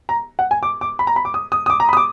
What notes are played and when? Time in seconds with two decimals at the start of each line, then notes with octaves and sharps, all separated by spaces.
0.09 A#5
0.39 F#5
0.51 G#5
0.63 D6
0.81 D6
0.99 B5
1.07 A#5
1.16 B5
1.25 D6
1.34 D#6
1.52 D#6
1.66 D#6
1.70 D6
1.80 A#5
1.89 B5
1.93 D#6
1.97 D6